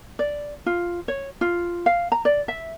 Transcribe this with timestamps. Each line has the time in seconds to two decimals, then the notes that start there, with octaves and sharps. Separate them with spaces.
0.19 D5
0.66 F4
1.08 C#5
1.41 F4
1.86 F5
2.12 A#5
2.25 D5
2.48 E5